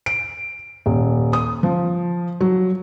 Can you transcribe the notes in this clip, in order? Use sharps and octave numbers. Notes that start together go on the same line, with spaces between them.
D7
D#1
D#6
F3
F#3